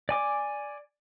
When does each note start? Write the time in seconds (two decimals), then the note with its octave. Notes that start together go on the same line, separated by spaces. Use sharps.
0.09 D5 G#5 D6